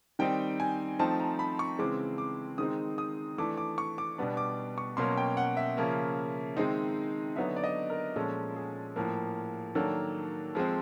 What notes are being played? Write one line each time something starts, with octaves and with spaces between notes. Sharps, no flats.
D#3 G3 C4 D#4 G5
G#5
F3 A3 C4 D#4 A5
A#5
B5
C#6
C#3 E3 G#3 C4 D6
D6
D#3 G#3 C4 D#4 D#6
D#6
E3 A3 D4 D6
D6
C#6
D6
B2 G3 B3 D4
D6
C#6
B2 F#3 A#3 C#4 C6
G5
F#5
E5
C#3 F3 A#3 C#4
D#3 G#3 C4 D#4
D3 F#3 B3 D#4 E5
D5
D#5
A#4
A#2 F3 G#3 C#4 A4
G#4
A2 F3 A#3
D#3 F#3 A#3 D4 A4
F3 G#3 C4